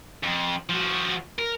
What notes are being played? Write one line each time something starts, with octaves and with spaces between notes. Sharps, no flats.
F2
F3 F#4
A#4